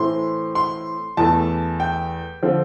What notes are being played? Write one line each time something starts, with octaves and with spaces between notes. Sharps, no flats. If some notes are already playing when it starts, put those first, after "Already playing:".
Already playing: A2 E3 A3 C4 C6
C6
E2 E3 A3 A5
G5
D3 F3 C4